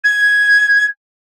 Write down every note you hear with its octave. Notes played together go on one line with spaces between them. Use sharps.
G#6